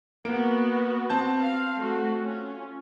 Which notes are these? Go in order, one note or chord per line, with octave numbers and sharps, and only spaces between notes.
A#3 B3 F#4 D7
C4 A5 G6
F5
A3 F#4
C#4 F4